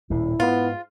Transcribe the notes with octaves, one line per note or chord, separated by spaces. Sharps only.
D#1 A2 E4
G#2 B3 F4